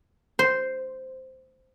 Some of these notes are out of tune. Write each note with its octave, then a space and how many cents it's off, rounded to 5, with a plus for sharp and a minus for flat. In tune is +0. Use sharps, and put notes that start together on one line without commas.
C5 -5